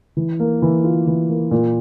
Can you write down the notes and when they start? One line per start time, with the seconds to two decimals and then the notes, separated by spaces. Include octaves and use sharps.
0.17 E3
0.40 A#3
0.62 E3
0.84 F4
1.07 E3
1.30 A#3
1.51 A#2